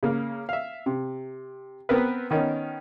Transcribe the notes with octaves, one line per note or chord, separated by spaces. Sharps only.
C#3 A#3
E5 F5
C3
B3 C4 A#4 B4
D#3 B3 C#4 D#4 A#4